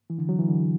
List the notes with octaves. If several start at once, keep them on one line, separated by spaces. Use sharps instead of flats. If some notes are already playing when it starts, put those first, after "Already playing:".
E3
D3
F#3
E3
D3